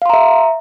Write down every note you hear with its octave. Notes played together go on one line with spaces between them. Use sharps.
E5 F5 A#5 C6